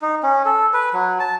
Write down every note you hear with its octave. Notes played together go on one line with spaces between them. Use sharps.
D#4
C#4
A4
B4
F#3
A5